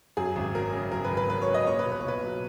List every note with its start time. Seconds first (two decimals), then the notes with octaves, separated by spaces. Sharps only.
0.17 F#2 G#4
0.36 G#1
0.54 F#3 A#4
0.73 C#3
0.92 F#2 A#4
1.04 B4
1.10 G#1
1.17 B4
1.29 F#3 B4
1.42 C#5
1.48 C#3
1.54 D#5
1.67 A#2 C#5
1.79 B4
1.86 B1
1.92 B4
2.00 C#5
2.04 B1 B4
2.23 F#3